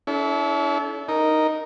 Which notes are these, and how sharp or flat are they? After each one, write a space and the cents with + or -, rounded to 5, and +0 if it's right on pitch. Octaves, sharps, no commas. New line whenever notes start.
C#4 +40 E4 -15 A4 -35
D#4 +0 A#4 +0